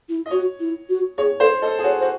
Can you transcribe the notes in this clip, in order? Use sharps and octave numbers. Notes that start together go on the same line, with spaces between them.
E4
D#5
F#4 C#5
E4
F#4
G#4 C#5
A4 C5
A4 D#5
G#4
F#4 C#5
F#4 C5